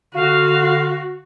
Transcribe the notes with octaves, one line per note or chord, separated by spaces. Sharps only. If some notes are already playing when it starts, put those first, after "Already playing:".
D3 F#4 F5